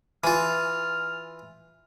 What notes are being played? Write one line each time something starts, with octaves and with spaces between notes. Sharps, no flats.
E3 F4 G#5 F6